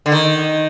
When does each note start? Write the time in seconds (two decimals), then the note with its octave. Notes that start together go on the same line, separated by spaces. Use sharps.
0.06 D3
0.12 D#3